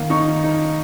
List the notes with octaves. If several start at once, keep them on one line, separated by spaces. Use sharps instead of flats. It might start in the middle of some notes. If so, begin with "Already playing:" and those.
Already playing: D#3 A#3 F5
D#4 C#6
D#4